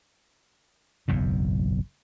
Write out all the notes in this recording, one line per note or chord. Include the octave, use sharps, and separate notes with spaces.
F#1 B1 E2 A2